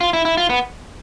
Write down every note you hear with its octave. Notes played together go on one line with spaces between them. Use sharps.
F4
E4
E4
F4
B3